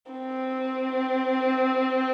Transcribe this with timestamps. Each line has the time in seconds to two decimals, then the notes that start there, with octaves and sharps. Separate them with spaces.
0.12 C4